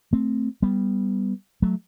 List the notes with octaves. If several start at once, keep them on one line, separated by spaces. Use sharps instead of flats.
A3 C4
G3 B3
F#3 A3